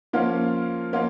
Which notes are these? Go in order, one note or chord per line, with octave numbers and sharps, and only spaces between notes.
F3 A#3 C#4 F4
F3 A#3 C#4 F4